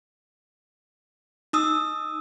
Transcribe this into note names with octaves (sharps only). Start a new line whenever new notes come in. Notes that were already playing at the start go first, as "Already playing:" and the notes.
D#4 D#6 E6